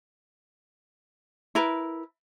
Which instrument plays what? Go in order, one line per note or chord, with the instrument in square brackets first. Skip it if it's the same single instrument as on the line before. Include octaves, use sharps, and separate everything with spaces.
[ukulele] E4 A#4 B4